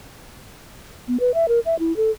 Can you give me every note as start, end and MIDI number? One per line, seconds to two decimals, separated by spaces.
1.08 1.17 59
1.20 1.34 71
1.34 1.48 76
1.48 1.59 70
1.66 1.78 76
1.79 1.95 64
1.96 2.10 69